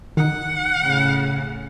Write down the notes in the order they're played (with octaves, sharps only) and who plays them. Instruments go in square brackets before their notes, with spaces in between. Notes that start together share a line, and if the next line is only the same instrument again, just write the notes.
[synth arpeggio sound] D#3 D#4 [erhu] F#5
[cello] A2 C#3